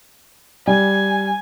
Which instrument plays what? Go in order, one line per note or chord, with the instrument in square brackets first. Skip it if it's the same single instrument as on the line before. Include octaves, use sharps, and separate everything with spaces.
[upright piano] G3 [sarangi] G#5